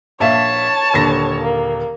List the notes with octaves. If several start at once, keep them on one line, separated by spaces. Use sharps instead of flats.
A#1 C#5 E5 F5 A5
D#1 D3 A#6
A#3